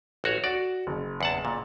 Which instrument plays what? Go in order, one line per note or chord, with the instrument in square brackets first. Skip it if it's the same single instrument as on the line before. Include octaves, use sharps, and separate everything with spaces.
[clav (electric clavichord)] A1 F#4 C#5
[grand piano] F#4 [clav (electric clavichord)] D5
[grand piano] F#1
[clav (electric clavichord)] E2 F#5 A5
A#2